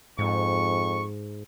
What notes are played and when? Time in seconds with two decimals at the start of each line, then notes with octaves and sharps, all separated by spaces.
0.19 F2 G#2 C#6